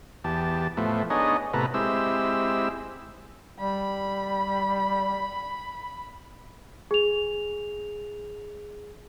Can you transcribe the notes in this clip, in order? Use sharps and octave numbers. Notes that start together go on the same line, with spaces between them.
E2 G4 A5
A2 F3 A3 B3
B3 D4 D#4 G#4 C#5 D#5
A2 C3 B3 A4 B4 A#5
G#3 C4 E4 G4 E6
G3 B5
G#4 F7